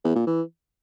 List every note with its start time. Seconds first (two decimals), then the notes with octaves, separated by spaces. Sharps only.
0.04 E2
0.15 A#2
0.27 E3